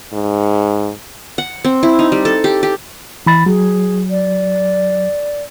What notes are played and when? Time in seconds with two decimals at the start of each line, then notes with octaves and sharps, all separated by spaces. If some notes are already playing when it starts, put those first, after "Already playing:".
0.13 G#2
1.38 F#5
1.64 C4
1.83 E4
1.99 D#4
2.12 G3
2.25 A4
2.44 G4
2.63 G4
3.26 E3 B5 A6
3.46 F#3 G#4
4.10 D5